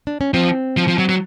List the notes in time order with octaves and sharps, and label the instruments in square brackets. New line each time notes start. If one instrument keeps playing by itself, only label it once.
[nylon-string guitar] D4
C#4
[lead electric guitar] F3 [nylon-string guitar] C4
[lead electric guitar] F3
F3
F#3
F#3